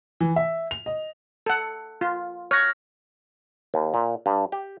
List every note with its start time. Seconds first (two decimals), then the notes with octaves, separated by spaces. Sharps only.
0.20 E3
0.36 E5
0.71 F7
0.86 D#5
1.46 A4 F#5
2.01 F4
2.51 C#5 F6 F#6 A#6
3.74 D#2
3.94 A#2
4.26 G2
4.52 G4